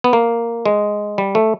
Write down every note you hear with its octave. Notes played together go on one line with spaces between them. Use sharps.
B3
A#3
G#3
G3
A3